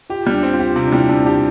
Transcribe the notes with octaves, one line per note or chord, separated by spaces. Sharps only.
F4 G4
G3
D4
C4
F4
G4
C3 F4
D4
G3 E4
C3 D4
D4 G4